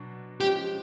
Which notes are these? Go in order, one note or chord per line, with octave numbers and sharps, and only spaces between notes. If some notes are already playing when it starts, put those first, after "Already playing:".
Already playing: B2 F#3 D4 F#4
F3 G#3 C#4 G4